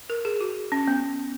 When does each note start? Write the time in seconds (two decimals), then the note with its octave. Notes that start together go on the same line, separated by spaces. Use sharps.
0.10 A#4
0.25 G#4
0.41 F#4
0.72 C#4
0.88 B3